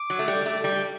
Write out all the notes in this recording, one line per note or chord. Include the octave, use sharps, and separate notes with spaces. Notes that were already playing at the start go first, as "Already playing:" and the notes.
Already playing: D6
F#3
A3
G3
A3
G3 D6